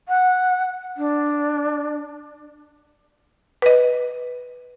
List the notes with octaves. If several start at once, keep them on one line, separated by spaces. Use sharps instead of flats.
F#5
D4
B4 D#5